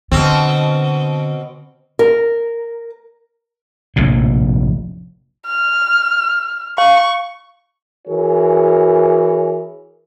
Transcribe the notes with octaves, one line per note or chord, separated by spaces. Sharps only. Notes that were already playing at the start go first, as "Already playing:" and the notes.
B2 D3 C4
A#4
F1 A#1 A2
F6
F5 C#6
E3 F#4 G#4 A#4 C#5